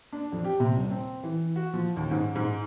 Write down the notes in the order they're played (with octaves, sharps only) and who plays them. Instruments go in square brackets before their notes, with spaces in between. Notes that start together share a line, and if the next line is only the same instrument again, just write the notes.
[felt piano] D4
F2
G4
C3
D#1
C4
E3
F#4
F3
D#2
G#2
G#2